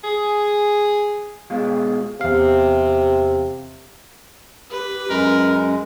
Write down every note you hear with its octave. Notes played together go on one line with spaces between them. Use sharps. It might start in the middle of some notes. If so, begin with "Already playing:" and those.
G#4
B2 G#3 F4
E2 C3 F5
G4 B4
F#2 G#3 C#4 A#4